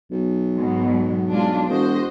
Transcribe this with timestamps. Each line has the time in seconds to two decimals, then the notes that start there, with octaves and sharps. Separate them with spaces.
0.11 B1
0.56 G#2 B2 F#3
1.29 G#3 D4 F4
1.69 E1 F#4 C5 D#5